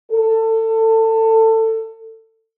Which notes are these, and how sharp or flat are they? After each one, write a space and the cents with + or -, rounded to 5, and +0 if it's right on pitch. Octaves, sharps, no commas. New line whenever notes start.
A4 +25